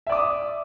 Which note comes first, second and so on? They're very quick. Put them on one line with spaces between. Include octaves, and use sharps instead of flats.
E5 D5 D6 D#6